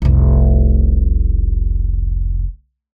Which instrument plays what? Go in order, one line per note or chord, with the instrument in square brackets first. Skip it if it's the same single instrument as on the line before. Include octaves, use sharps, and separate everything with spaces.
[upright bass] F1 C2